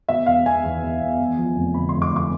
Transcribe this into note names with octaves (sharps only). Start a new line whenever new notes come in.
B2 E5
E1 F5
E1 G#5
E2
B2
E1
E2
F3
F1
D3 B5
F1 C6
D6
F1 D6